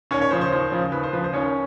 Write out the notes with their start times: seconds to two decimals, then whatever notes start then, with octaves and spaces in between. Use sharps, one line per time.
0.11 D#2 C#4 C#5
0.21 C#5
0.31 C#3 F3 C5
0.41 C5
0.52 D#2 C5
0.72 C#3 F3
0.92 D#2 B4
1.03 C5
1.13 C#3 F3 B4
1.24 C5
1.33 D#2 C#4 C#5